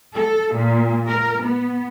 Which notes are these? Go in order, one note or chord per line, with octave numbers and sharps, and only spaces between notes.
A4
A#2
A#4
B3